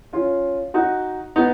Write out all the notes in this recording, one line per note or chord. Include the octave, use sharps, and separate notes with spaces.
C#4 F4
D#4 F#4
B3 D#4